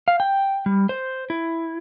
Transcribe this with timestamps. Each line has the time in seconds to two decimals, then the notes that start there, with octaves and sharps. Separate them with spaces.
0.08 F5
0.20 G5
0.66 G3
0.89 C5
1.30 E4